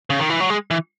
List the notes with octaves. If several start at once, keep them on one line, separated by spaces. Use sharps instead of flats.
C#3
D#3
E3
F#3
G#3
E3